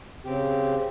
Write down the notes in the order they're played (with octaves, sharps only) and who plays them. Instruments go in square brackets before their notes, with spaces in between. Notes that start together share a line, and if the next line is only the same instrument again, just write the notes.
[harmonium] C#3 C4 G4